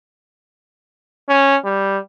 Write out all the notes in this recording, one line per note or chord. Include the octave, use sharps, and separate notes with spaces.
C#4
G3